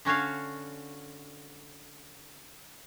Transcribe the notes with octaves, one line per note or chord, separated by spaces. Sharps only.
D3 C#4 F#4 C#5 F5